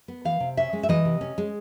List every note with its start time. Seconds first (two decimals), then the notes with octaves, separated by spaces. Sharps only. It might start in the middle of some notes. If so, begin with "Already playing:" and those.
0.08 B3
0.25 E3 F5
0.40 C3
0.57 C#4 E5
0.73 G#3
0.83 E5
0.89 E3 D#5
1.05 C3
1.21 C#4
1.38 G#3